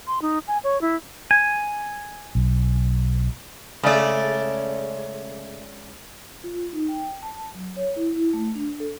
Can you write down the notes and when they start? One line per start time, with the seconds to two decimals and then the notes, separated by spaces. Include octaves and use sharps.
0.07 C6
0.22 D#4
0.47 G#5
0.64 C#5
0.81 E4
1.31 G#5
2.35 B1
3.83 C#3 G#3 A3 C#4 D5
6.44 F4
6.73 D#4
6.88 G5
7.22 A5
7.55 F#3
7.77 C#5
7.96 E4
8.16 E4
8.33 A3
8.55 D4
8.80 A4